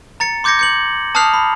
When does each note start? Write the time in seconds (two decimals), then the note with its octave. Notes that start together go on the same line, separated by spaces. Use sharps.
0.20 A#5 A6 C#7
0.44 C6 D6 G6 G#6 A#6 C#7
0.59 G6 C#7 F#7
1.15 A5 D#6 F6 F#6 C7 F7
1.34 B5